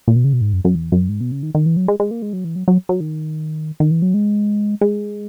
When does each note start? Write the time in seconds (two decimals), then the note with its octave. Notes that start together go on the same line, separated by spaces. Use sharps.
0.08 A#2
0.16 B2
0.24 C#3
0.33 B2
0.41 G#2
0.53 F#2
0.65 F#2
0.75 E2
0.92 F#2
1.09 G#2
1.21 B2
1.32 C#3
1.43 D#3
1.55 D#3
1.66 E3
1.77 F#3
1.88 G#3
2.00 G#3
2.11 A#3
2.22 G#3
2.33 F#3
2.45 E3
2.56 F#3
2.68 F#3
2.89 F#3
3.00 D#3
3.80 D#3
3.91 E3
4.02 F#3
4.14 G#3
4.81 G#3